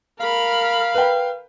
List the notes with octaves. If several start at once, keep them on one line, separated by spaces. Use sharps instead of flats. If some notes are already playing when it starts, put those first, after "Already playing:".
A#4 F5 B5
B4 G5